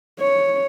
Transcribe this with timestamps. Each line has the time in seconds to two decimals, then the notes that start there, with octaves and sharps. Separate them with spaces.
0.20 C#5